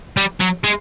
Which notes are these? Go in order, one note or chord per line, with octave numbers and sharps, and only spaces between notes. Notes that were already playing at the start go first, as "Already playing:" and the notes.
G3
F#3
G#3